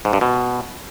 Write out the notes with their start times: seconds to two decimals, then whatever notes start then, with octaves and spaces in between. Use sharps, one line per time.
0.05 G#2
0.13 G2
0.21 B2